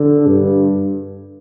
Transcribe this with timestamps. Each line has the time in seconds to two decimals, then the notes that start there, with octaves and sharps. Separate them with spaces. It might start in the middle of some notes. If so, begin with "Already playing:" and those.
Already playing: D3
0.26 G2